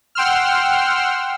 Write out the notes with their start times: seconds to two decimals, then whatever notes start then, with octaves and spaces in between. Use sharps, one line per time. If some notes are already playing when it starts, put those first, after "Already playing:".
0.15 F#5 G5 C6 E6 F6